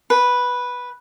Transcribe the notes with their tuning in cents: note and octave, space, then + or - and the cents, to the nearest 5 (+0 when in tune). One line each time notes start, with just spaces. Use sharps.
B4 -5